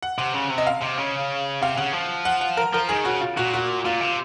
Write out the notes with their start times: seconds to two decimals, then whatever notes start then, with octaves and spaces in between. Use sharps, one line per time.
0.02 F#5
0.19 C3 F#5
0.34 C#3
0.51 C3
0.58 D#5
0.67 F5
0.82 C3
0.98 C#3
1.62 C3 F5
1.77 C#3 F#5
1.94 F3
2.25 F#5
2.41 F#5
2.57 A#4
2.73 F3 A#4
2.89 D#3 G#4
3.05 C#3 F#4
3.21 F4
3.37 A#2 F#4
3.54 F#4
3.85 A#2 F4
4.01 C3